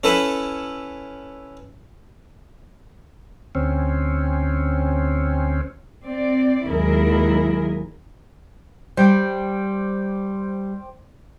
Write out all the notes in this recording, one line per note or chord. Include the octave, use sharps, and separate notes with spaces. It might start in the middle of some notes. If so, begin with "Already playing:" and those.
C#4 E4 A4 B4
D2 C4 C#4
C4 D5
D#2 G#2 F#3 E4 G#4 A#4
G3 C5 G5 D6